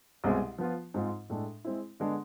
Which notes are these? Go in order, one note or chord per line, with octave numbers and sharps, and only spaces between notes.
C2 B2 G#3 C4 G#4
F3 B3 F4
G#2 G#3 C4 F4
A2 G#3 D4 A4
G#3 C4 E4
D3 G#3 B3 D4